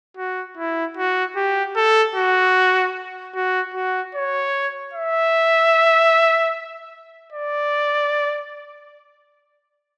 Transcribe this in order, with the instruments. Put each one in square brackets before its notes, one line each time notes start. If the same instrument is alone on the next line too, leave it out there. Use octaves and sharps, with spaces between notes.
[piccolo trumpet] F#4
E4
F#4
G4
A4
F#4
F#4
F#4
C#5
E5
D5